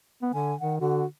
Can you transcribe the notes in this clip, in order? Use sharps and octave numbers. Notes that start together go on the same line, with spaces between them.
B3
D3 G#5
D#3 F#5
D3 F#4